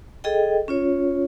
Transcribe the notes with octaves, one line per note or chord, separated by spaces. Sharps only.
G#4 A4 D#5 G5
C#4 F4 C#5